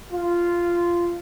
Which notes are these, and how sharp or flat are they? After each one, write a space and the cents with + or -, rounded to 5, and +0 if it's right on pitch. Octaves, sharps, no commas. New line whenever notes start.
F4 -10